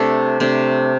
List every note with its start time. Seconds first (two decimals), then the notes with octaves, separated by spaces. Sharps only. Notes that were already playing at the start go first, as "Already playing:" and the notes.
Already playing: C3 A3 D4 A4
0.40 C3 A3 D4